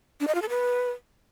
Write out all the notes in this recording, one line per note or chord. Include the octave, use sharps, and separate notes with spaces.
D4
D#5
F4
A4
B4